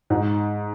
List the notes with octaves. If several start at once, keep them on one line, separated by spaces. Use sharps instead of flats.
G#2